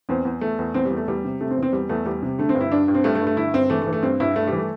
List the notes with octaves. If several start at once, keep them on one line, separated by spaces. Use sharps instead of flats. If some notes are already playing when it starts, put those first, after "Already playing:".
E2 C4
E2
E2 A3
E2
E2 C4
G3
E2
A3
E2 G3
C3
C3 A3
C4
E2
C4
E2 G3
E2 A3
E2 G3
C3
D3 A3
C4
G2
E4
G2 D4
G2
C4
G2 A3
A3
G2
A3
D3 E4
G2 C4
E3 A3
A3
E3
A3
G2 C4
G2 E4
G2 A3
E3 G3
A3